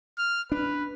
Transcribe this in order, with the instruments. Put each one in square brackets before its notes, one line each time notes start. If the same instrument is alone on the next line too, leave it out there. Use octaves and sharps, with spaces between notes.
[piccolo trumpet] F6
[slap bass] D4 [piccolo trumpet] B4